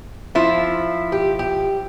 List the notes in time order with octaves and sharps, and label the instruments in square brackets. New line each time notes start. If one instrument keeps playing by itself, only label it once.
[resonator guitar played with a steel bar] F3 E4
[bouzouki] G4
G4